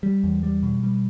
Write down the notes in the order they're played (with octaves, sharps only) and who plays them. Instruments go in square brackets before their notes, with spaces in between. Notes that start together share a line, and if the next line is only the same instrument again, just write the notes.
[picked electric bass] G3
E2
G3
B2
G3